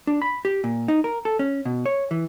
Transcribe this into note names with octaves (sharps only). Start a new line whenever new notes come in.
D4
B5
G4
A#2
D#4
A#4
A4
C#4
B2
C#5
E3